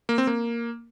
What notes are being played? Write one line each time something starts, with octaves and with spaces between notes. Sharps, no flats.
A#3
C4
A#3